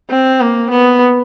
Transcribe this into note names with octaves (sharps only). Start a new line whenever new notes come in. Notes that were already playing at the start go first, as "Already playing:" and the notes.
C4
A#3
B3